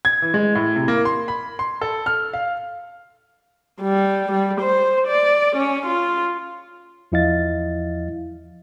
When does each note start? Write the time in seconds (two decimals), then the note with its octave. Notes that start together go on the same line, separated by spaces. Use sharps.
0.05 G#6
0.22 E3
0.34 G#3
0.55 A2
0.76 C3
0.88 A#3
1.05 C6
1.28 B5
1.59 C6
1.81 A4
2.06 F6
2.33 F5
3.81 G3
4.32 G3
4.61 C5
5.07 D5
5.56 C#4
5.86 F4
7.12 E2 F3 E4 D#5 F5 A6